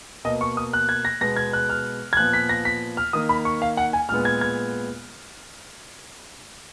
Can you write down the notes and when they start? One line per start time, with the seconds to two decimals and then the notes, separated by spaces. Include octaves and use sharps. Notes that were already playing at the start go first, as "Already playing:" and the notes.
0.25 B2 A#3 D#5
0.41 C#6
0.57 D#6
0.73 F#6
0.89 G#6
1.05 A#6
1.21 B2 G#3 B3 A#6
1.37 G#6
1.53 F#6
1.69 F6
2.13 G#6
2.17 A#2 F3 B3 F#6
2.33 B6
2.49 A#6
2.65 B6
2.97 F6
3.13 D#3 A#3 D#6
3.29 B5
3.45 C#6
3.62 F5
3.77 F#5
3.93 G#5
4.09 A#2 G#3 B3 F6
4.25 G#6
4.41 G#6